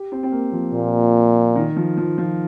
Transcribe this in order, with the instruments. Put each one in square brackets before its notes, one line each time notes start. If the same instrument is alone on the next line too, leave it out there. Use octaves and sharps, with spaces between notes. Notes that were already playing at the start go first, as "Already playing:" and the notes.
Already playing: [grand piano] G4
C4
C4
A#3
F3
[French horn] A#2
[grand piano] D#3
F3
F3
F3